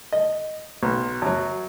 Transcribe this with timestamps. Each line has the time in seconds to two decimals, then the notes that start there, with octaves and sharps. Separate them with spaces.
0.13 D#5
0.83 B1
1.22 F#2 F#3